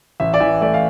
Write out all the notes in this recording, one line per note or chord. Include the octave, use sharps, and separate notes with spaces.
A1 E5
D5
E3 E5
A3 D5
F5